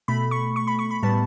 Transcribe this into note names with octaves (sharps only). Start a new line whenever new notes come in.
B2 A3 B5
C#6
C#6
B5
C#6
B5
A2 G3 B3 A5